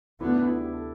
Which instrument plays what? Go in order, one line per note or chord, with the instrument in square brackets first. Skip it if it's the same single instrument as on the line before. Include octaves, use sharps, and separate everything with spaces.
[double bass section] D2 D3 B3 [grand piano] E4
[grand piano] D4
E4
G4
A4